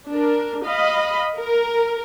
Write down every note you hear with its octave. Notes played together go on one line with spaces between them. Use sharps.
D4 A#4
D#5 F5 B5
A#4